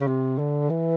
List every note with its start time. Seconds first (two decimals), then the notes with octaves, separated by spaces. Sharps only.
0.01 C#3
0.07 C3
0.38 D3
0.70 E3